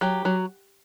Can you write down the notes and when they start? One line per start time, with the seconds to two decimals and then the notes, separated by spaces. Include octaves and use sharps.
0.01 F#3 G4
0.25 F#3